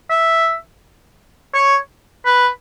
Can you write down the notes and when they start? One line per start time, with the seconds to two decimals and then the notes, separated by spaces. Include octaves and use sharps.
0.10 E5
1.54 C#5
2.26 B4